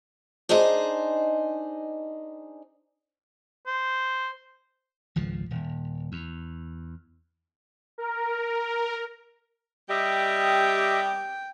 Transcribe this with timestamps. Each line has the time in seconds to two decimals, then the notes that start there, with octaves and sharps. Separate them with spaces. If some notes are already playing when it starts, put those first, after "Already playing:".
0.49 D4 D#4 G#4 C5 D#5
3.67 C5
5.16 G#1 C#2 F3
5.50 D#1
6.12 E2
7.98 A#4
9.90 G3 G4 D#5 E5 G5